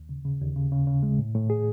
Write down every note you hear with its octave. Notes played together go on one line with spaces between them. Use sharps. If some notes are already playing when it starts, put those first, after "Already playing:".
Already playing: D#2
C#3
C#3
D#2
C#3
C#3
C#3
G#3
A2
A2
G#4